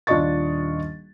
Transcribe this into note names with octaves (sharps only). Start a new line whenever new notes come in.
D#1 D4 F4 D#5 C#6 A6